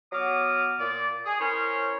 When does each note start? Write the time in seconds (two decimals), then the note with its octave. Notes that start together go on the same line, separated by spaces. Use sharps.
0.13 F#3 B3 D6 D#6 F6
0.79 A#2 D5
1.25 G#4
1.40 C#4 E4 A#4 C5 C#5